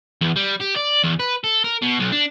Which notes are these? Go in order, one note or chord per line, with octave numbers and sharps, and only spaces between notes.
E2
G3
G4
D5
E2
B4
A4
A#4
B2
B1
D4